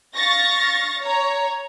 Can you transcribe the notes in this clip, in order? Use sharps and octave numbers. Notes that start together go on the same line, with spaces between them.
F5 C#6 A6 A#6
C#5 A#5